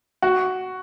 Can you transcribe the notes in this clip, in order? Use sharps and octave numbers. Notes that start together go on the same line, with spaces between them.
F#4